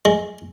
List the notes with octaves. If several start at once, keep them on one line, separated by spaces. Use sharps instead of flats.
G#3